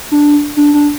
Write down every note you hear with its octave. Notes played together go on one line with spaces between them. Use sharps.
D4
D4
D4